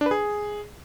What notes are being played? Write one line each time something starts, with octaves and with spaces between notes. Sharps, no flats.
D4
B4
G#4